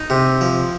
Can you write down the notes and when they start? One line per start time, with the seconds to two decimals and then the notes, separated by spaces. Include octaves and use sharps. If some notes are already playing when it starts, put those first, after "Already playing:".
Already playing: D#4
0.10 C3
0.41 F3